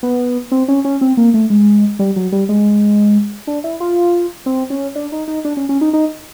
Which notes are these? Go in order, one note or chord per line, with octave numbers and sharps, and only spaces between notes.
B3
C4
C#4
C#4
C4
A#3
A3
G#3
G3
F#3
G3
G#3
D4
E4
F4
C4
C#4
D4
D#4
D#4
D4
C#4
C#4
D#4
D#4